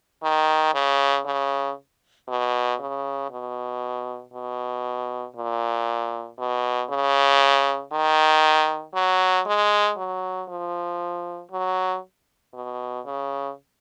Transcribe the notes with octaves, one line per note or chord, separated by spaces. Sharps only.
D#3
C#3
C#3
B2
C#3
B2
B2
A#2
B2
C#3
D#3
F#3
G#3
F#3
F3
F#3
B2
C#3